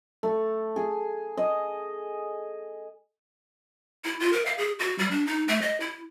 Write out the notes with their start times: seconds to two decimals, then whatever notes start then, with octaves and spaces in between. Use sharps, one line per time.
0.23 A3
0.76 G#4
1.37 D#5
4.04 E4
4.20 F4
4.33 A#4
4.46 F5
4.58 G#4
4.79 F#4
4.99 G3
5.11 D4
5.27 D#4
5.48 A3
5.62 D#5
5.80 E4